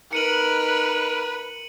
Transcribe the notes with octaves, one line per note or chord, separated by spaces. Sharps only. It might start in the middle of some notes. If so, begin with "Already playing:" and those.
D#4 A#4 B4 C#7 D#7 F#7